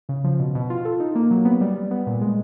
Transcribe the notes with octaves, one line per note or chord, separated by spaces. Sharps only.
C#3
F3
B2
B2
F4
A4
D#4
A#3
F#3
B3
G3
G3
B3
A#2
G#3